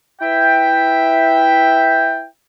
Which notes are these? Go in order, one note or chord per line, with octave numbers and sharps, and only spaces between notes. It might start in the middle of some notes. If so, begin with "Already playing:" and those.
E4 B4 E5 G5